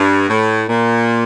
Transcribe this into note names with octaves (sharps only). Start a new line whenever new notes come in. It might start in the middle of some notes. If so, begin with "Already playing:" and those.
Already playing: G2
A2
A#2